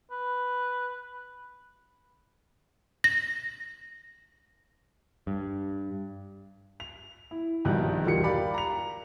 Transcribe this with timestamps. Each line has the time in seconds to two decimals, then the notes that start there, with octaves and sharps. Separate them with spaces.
0.11 B4
3.04 A#6
5.27 G2
6.80 F7
7.31 E4
7.65 A#1 G2 B2 D#3 F#6
8.05 E1 B2 F4 G4 A#4 C#7
8.23 G4 A#4 D5 F5 B5 D6
8.54 A#5 F7